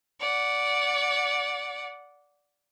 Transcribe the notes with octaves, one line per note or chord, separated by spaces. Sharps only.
D5 F#5